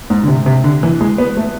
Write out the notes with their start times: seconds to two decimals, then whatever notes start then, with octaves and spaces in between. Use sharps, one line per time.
0.10 G#2
0.23 D3
0.28 C3
0.46 C3
0.64 D3
0.83 E3
1.01 G#3
1.18 B3
1.37 A3